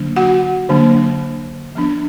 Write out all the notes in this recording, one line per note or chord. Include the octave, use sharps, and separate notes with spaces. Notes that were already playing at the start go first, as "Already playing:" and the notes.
Already playing: D3 F#3 A#3 D4
F#4 F#5
D3 F#3 A#3 D4
F3 B3 D4